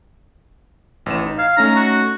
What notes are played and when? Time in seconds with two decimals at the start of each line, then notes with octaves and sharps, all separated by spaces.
1.06 A1 E3 E7
1.26 D#4
1.39 F5 G#6
1.57 A3 C#4 D#4 A#5
1.76 F#4